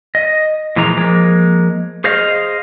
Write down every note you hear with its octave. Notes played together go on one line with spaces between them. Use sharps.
D#5
A#2 E3 F3 G#3 A#5
F3 G#3 A#3
G#4 C5 D#5 F5